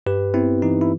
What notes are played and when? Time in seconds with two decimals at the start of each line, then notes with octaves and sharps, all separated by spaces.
0.06 G2 G4 B4
0.34 B3 C4 E4
0.62 E3 D#4
0.81 E4